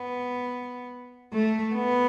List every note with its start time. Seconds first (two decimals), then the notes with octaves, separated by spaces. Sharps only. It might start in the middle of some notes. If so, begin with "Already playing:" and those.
Already playing: B3
1.33 A3
1.75 B3